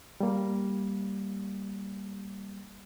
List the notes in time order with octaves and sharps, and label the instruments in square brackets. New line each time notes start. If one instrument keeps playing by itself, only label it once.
[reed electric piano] G3 A#3